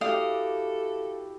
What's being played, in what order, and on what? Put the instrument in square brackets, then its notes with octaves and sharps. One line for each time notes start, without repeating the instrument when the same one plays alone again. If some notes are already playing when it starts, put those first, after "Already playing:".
[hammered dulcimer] E4 F#4 G4 [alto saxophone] A4 [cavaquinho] D5 F5 D#6